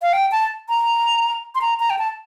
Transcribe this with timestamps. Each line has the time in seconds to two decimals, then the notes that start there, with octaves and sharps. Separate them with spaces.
0.02 F5
0.13 G5
0.32 A5
0.69 A#5
1.55 C6
1.61 A#5
1.80 A#5
1.90 G5
1.99 A5